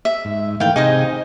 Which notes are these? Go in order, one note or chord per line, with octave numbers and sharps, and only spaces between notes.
E5
G#2
D#3 E3 A3 F5 G5
C3 D#4 G#4 C5 D#5 G#5